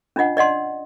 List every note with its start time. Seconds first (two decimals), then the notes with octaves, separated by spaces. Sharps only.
0.16 C#4 D4 F4 D#5 F#5
0.37 D5 D#5 F#5 C6